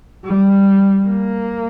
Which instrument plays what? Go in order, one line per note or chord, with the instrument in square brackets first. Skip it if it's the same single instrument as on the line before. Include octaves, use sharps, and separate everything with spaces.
[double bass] G3
A#3